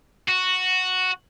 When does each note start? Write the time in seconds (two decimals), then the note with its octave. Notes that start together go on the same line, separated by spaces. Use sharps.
0.28 F#4